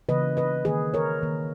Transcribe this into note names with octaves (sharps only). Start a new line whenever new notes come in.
C#3 E3 A#3 B4 D#5
B4 D#5
D#3 A#3 G#4 B4
A#4 C#5
D#3 A#3